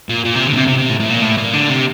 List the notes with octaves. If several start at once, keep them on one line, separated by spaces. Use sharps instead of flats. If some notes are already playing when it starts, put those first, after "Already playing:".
A#2
A#2
C3
D3
A#2
C3
C3
C3
A2
A2
A#2
A2
A#2
D3
C3